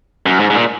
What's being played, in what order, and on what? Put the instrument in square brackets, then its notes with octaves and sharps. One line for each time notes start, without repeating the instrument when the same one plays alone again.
[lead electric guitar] F#2
G#2
G#2
A#2